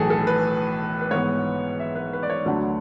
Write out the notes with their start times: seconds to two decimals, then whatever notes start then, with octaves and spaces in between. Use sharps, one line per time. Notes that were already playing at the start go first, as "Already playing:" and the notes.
Already playing: B1 A2 E3 G#4 A4
0.10 A4
0.27 B4
1.01 B4
1.11 G#2 E3 B3 C#5
1.80 E5
1.95 B4
2.13 B4
2.23 D5
2.30 C#5
2.46 D2 D3 F#3 A3 D4 F#5